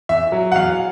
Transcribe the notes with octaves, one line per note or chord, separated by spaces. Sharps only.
E2 E5
F#3
F#5
E2 F5